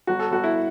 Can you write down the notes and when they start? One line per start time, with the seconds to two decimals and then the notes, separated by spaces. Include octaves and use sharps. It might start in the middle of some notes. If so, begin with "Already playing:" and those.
0.07 G1 F#4
0.19 A4
0.31 G1 F#4
0.44 E4